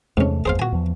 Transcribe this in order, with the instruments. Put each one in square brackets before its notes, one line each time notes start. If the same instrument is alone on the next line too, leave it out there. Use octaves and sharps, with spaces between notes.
[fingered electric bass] E2 C3 A3 [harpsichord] G#2 C#4
[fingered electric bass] G1 E2 [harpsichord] G#4 C5 F5
[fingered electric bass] A#2 [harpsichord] F#4 G#5
[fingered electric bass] E2 F3